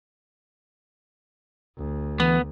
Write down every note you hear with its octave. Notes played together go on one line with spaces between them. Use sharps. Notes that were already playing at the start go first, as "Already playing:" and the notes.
D2
E3 B3